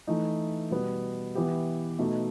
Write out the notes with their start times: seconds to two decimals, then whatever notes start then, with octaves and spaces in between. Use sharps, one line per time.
0.07 E3 A3 D#4
0.71 B2 G3 B3
1.35 E3 B3 E4 G4
1.99 B2 A3 D#4